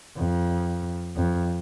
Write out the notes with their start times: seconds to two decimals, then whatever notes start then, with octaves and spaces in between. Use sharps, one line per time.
0.18 F2
1.16 F2